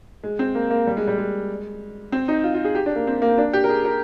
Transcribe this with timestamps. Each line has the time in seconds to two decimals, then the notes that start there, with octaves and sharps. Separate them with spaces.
0.24 G#3
0.39 C4
0.55 A#3
0.70 A#3
0.87 G3
0.97 G#3
1.07 G3
1.18 G#3
2.12 C4
2.28 D#4
2.44 F4
2.54 F4
2.65 G#4
2.75 G4
2.86 D4
2.96 A#3
3.07 C4
3.22 A#3
3.38 D4
3.53 G4
3.64 A#4
3.69 G#4
3.85 A#4